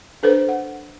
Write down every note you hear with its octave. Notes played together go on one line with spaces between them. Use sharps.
D4 A4 B4 C5
F#5